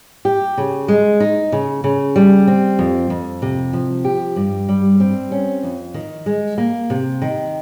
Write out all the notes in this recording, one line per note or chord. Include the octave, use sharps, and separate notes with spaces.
G4
C#3
G#3
D#4
C#3
C#3
G3
C4
F2
F2
C3
F3
G4
G2
G3
C4
C#4
F2
D#3
G#3
A#3
C3
D#3